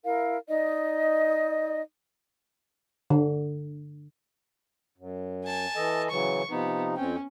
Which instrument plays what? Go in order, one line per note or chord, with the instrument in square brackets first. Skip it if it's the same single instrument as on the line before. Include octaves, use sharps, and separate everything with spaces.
[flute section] E4 A#4 F5
D#4 D5 D#5
[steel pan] D3
[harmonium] F#2
[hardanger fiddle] G#5 A5
[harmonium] E3 A4 D#5
[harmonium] C#3 E3 F#3 [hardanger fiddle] C#6
[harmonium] C3 F3 D#4 [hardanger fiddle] B3
[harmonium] F2 C4 G5 [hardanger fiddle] C#4